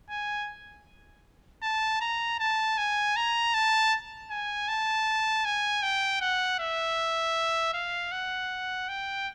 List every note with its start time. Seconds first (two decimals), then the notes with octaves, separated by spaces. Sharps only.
0.10 G#5
1.63 A5
2.01 A#5
2.39 A5
2.78 G#5
3.16 A#5
3.54 A5
4.30 G#5
4.68 A5
5.45 G#5
5.83 G5
6.21 F#5
6.59 E5
7.73 F5
8.12 F#5
8.89 G5